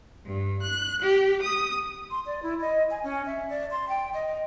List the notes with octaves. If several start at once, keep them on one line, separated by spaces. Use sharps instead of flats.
G2
F#6
G4
D#6
C6
D5
E4
D#5
G#5
C#4
E5
D5
C6
G5
D#5